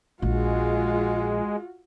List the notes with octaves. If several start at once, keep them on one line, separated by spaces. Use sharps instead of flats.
A#1 G#3 F4 F#4